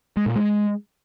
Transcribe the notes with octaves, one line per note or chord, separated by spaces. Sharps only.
G#3
A#2
G#3